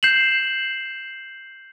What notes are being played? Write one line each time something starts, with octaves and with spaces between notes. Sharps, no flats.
G6 C7 E7 F#7